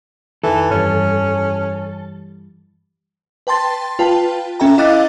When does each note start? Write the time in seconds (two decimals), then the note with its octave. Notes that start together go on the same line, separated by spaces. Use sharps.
0.44 F2 D#3 E3 A4
0.71 G2 E3 G3 C#4
3.47 B4 G5 A5 C6 A6
3.99 F4 B4 G5 A5
4.60 C#4 A4 E5 G5 A#5
4.78 E4 D#5 F5 D6 F#6 A6